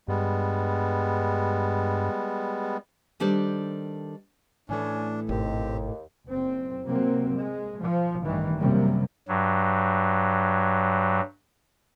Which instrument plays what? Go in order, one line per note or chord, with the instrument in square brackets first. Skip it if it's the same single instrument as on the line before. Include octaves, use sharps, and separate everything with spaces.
[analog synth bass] G2 [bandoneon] G3 G#3 B3
[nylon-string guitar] D#3 G3 D4 A4 C5
[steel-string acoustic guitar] A2 E3 A3 [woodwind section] C#4 G#5 [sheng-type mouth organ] D4
[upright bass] G#1 B2 [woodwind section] D#2 [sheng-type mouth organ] C4 G4
[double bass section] F#1 C4
C3 F#3 A#3 C4
G#3
F3
A1 G2 D#3 E3
F#2 C3 G3 A#3
[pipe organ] G2 F#3